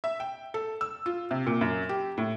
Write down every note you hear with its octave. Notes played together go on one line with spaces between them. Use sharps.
E5
G5
A4
E6
F4
C3
A#2
F#2
G4
A2